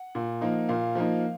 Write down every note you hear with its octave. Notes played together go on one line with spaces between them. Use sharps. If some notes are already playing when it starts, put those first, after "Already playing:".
Already playing: F#5
A#2
F3 A#3 D#4
A#2 F5
F3 A#3 D#4